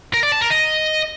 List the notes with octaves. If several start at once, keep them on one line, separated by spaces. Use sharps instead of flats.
A#4
D5
A5
A#4
D#5